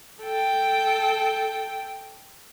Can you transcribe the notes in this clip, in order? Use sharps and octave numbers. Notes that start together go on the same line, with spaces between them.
A4 G5